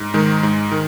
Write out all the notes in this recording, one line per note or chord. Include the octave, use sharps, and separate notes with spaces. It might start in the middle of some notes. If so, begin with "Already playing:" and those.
Already playing: G#2
D#3 G#3
G#2
D#3